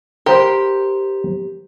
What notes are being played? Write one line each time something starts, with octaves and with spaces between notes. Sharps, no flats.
G4 A#4 C5